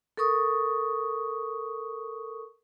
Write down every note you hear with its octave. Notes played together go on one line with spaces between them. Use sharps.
A4 A#4 C#6 D#6